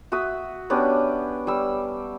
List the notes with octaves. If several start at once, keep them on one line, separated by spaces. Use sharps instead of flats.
F#4 E5 D#6
B3 C#4 D4 G4
G3 E6